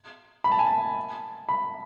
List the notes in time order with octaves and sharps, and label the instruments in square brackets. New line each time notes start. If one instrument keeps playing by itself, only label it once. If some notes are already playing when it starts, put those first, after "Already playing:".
[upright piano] B5
A5
G#5
A5
B5